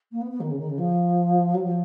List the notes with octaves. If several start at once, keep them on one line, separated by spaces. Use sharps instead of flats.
A#3
B3
B3
D#3
C#3
D#3
C#3
F3
F#3
F3